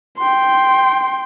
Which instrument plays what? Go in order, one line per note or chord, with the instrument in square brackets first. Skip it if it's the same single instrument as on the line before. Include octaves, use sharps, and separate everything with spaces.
[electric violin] G5 C6